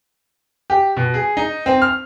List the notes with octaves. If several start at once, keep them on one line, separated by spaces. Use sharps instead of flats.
G4
B2
G#4
D#4
C4
F6